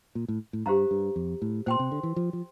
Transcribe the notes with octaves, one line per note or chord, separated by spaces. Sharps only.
A#2
A2
A2
G2 G4 C5 F5 A#5
G2
F2
A2
A#2 C5 G5 C6
C3
D3
E3
F3
F3